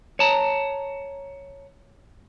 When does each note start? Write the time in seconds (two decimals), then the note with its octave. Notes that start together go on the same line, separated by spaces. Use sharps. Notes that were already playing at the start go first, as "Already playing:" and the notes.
0.19 C#5 A5 A#5